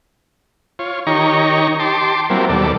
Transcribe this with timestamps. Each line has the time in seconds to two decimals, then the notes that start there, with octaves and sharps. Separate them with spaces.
0.79 F4 C#5
1.07 D#3 D#4 G4 C#5 A#5 C#6
1.80 G4 A5 C6 D6
2.30 F#3 G3 A#3 C4 E4
2.49 D#2 B2 G3 A4 D5